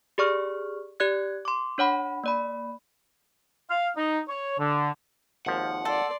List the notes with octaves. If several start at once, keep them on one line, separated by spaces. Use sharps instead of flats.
G4 G#4 D5 C#6 F6
G4 D5 F#6 G#6
C6 D6
D4 C#5 F#5 B5
A#3 D5 B5
F5
D#4
C#5
D3
G#1 D#2 F3 F#5
A4 D5 C6